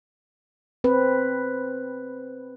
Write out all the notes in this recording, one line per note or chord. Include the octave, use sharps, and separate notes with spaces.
C4 B4